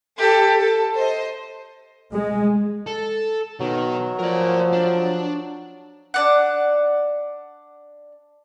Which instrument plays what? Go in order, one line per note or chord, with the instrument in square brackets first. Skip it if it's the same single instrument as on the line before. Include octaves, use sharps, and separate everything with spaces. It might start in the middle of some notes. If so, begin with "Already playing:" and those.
[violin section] G4 A4
A4
C5 D#5
[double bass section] G#3
[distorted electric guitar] A4
[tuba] B2 [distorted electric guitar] D#3 [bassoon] F#3
[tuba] F3 [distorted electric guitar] A#4 D5
[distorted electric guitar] D4
[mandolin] D4 D5 F#5